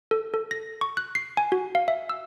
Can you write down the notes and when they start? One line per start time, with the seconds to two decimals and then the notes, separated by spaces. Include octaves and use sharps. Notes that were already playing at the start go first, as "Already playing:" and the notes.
0.11 A4
0.34 A4
0.51 A#6
0.81 C#6
0.97 F#6
1.15 C7
1.37 G#5
1.52 F#4
1.75 F5
1.88 E5
2.10 E6